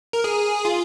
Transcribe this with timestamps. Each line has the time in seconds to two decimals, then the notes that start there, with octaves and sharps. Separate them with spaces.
0.13 A#4
0.24 G#4
0.65 F4